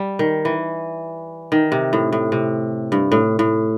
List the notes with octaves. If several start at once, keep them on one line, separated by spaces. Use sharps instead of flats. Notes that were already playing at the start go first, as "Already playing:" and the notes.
Already playing: G3
D#3
E3
D#3
C3
A2
A2
C3
G2
A2
A2